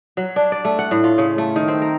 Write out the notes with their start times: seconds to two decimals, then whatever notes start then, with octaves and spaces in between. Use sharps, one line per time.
0.17 F#3
0.36 D4
0.52 D5
0.65 A3
0.79 F#5
0.91 A2
1.04 F4
1.18 C#3
1.38 A3
1.56 D#3
1.68 C4
1.82 A#4